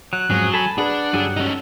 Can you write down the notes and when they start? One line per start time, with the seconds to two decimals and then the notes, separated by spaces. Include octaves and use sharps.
0.13 F#3 F#6
0.30 F2 G#2 F#3 C#4 G#4
0.54 A4 G#5 A5 B5
0.78 D4 G#4 B4 F#5
1.13 G2 D3 F#3 G3 G#4 A4
1.36 C#4 D#4 A4